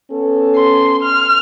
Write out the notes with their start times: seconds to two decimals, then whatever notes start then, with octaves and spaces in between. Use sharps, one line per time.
0.12 B3 C#4 A4
0.56 C6
1.03 F6